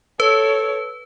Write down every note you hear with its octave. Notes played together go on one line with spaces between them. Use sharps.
A4 B4 C#5